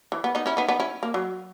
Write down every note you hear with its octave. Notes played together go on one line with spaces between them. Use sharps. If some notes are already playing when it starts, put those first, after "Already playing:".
E3
B3
B3 D#4
C#4 E4
B3 D#4
B3 D#4
C#4 E4
A#3
F#3